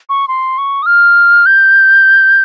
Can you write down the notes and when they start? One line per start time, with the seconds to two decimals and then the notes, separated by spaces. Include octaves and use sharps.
0.09 C#6
0.28 C6
0.58 C#6
0.82 D#6
0.86 F6
1.46 G6